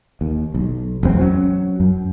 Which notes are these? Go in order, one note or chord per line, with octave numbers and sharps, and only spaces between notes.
D#2
B1
E1 F#2 C4
F#3 C#4
F#2